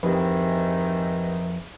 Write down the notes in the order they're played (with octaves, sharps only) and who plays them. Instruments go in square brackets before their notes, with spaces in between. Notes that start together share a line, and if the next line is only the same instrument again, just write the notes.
[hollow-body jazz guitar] F2 [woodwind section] G#2 D#3 E3 [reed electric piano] G4 B4